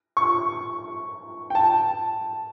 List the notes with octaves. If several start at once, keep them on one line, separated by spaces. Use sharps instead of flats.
C#6
G5
A5